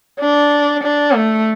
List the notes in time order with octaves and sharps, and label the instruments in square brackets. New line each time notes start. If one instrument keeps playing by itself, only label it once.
[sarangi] D4
D4
A3